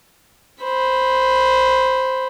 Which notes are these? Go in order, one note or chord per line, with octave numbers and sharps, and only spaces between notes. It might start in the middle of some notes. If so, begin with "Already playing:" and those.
C5 B5